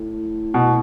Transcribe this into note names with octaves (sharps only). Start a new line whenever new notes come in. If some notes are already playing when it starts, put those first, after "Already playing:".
Already playing: A2
B2